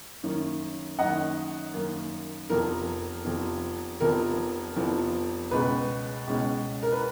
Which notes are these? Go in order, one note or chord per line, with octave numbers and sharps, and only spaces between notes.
F#2 D#3 A#3 C#4
F#2 D#3 A#3 C#4 D#5 F#5
F#2 D#3 A#3 C#4
F1 F2 F3 B3 A#4
F1 F2 F3 B3
F1 F2 F3 B3 A#4
F1 F2 F3 B3
C#2 B2 G#3 C#4 B4
C#2 B2 G#3 C#4
A#4
B4